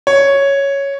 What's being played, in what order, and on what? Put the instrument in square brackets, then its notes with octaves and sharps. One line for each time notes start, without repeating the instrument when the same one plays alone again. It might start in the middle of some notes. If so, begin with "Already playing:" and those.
[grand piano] C#5